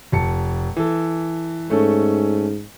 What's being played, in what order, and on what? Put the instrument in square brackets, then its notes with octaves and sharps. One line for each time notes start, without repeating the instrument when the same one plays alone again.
[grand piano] F1 A5 C#7
E3 A4
[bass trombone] G#2 [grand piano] A3 C#4 A4